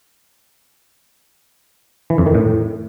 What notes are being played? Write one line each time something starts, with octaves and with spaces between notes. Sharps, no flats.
E3
F2
D#3
A2